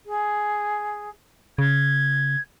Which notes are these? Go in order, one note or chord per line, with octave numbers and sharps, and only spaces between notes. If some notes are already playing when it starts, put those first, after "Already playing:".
G#4
C#3 G#6